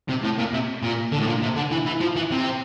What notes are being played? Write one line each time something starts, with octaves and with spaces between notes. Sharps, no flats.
C3
A2
A#2
C3
A#2
D3
A2
A#2
C3
D3
E3
E3
F3
E3
C3